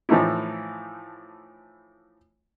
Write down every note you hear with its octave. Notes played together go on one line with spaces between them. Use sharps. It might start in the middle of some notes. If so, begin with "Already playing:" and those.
A2 E3 F3 A3 D#4 E4